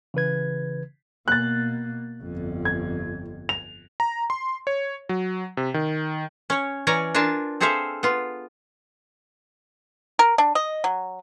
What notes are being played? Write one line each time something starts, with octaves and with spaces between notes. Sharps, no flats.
C#3 E3 B4 G#6
B2 A#3 F#6 A6
G1 F2
G#6
F7
A#5
C6
C#5
F#3
C3
D#3
C#4 C#5
E3 C#4 C#5 D5 A#5
D4 F4 A#4 G#5 A5
C4 G#4 A4 C5 E5 F5
B3 F4
A#4
D4
D#5
F#3